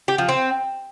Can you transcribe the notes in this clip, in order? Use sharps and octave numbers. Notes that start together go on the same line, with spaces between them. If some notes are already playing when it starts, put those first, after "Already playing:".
G4
F3
C4